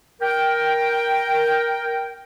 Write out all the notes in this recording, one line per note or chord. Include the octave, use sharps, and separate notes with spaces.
A#4 G5